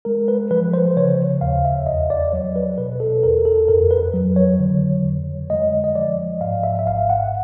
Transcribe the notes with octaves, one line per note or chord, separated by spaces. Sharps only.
G#3 A#4
B4
F3 B4
C5
C#3 C#5
D#2 F5
E5
E2 D#5
D5
F#3 C#5
B4
B2 B4
A4
E2 A#4
A4
F2 A#4
B4
F#3
C#5
D3
F2
G#3 D#5
D#5
F3 D5
G#2 F5
E5
E5
G#1 F5
F#5